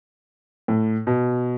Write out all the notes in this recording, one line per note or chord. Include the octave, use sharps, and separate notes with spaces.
A2
B2